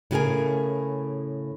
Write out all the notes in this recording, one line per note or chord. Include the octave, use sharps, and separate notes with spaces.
A2 C#3 F#4 G#4 A#4 G#5